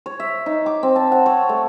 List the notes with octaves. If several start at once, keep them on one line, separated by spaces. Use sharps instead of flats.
C#5
E5
D#4
D6
C4
A5
F#5
C#5
A3